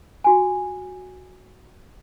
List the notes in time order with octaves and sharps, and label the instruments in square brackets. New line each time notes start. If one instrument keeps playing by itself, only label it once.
[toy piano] F4 F#4 G#5